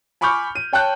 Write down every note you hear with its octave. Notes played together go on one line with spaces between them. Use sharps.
G#5 B5 C#6 D6 F6 G6
D#7
C#5 G5 A5 F#6 G6